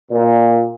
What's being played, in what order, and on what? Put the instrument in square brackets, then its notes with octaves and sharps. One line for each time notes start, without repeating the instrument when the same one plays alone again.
[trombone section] A#2